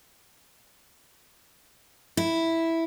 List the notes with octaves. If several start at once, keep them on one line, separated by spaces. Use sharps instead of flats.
E4